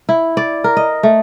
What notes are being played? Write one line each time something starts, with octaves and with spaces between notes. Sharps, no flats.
E4
D5
A#4
D#5
A3